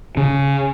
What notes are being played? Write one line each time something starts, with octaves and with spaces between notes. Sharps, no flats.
C#3